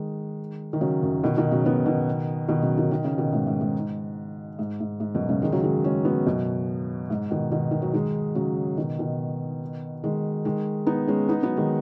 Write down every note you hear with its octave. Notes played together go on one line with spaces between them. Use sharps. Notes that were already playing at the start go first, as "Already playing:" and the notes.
Already playing: D#3 G#3
D#3
C#3 F#3
F#2
B2 D#3
B2 D#3
C#3 F#3
F#3 B3
B2 D#3
B2 D#3
C#3 F#3
B2 D#3
D#3
C#3
B2 D#3
G#2 C#3
G#2
G#2
G#2
G#2
G#2
F#2 B2
G#2 C#3
D#3 G#3
C#3 F#3
D#3 G#3
G#3 C#4
F#3 B3
F#2 B2
G#2
B2 D#3
B2 D#3
D#3
F#3
D#3 G#3
C#3 F#3
B2 D#3
B2 D#3
D#3 G#3
D#3 G#3
B3 D#4
G#3 C#4
B3 D#4
F#3 B3
D#3 G#3